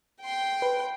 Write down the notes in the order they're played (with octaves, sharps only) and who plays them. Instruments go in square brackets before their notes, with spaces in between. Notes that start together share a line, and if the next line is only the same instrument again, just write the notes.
[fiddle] G5 C6
[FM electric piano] B4